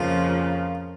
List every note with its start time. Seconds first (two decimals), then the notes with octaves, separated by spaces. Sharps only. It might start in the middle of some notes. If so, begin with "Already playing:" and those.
Already playing: F2 C#3 F3 A#3 F4